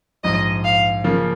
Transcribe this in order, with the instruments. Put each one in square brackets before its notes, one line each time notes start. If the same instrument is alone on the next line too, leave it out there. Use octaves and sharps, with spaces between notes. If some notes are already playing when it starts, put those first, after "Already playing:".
[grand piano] A#1 G#2 F3 [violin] D#5
[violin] F5
[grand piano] C#3 F3 A#3